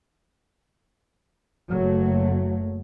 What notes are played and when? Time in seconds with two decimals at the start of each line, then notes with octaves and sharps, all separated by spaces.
1.70 F#1 F#3 A3